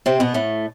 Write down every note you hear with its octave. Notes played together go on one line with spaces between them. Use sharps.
C3 C4
B2 B3
A2 A3